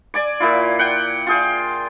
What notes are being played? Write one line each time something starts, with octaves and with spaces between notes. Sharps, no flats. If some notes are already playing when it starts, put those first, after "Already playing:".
D5 G#5 D6
A#2 E4 F4
F#5 G5
F4 G#4 G5